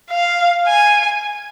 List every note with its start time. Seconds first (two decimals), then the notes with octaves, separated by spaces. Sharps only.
0.11 F5
0.67 G#5